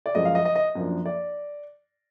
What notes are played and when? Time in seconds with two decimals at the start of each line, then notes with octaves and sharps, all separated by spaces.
0.06 D5
0.15 F#2 F3 G#3 D#5
0.25 F5
0.35 D#5
0.45 D#5
0.55 D#5
0.75 F#2 F3 A#3 D4
1.05 D5